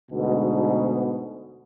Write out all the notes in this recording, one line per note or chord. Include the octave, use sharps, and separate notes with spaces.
D2 G#2 B2